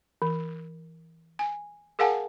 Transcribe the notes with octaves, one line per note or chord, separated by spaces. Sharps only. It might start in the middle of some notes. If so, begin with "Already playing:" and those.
E3
G#5
G#4 A#4 F5 F#5 G#5 A5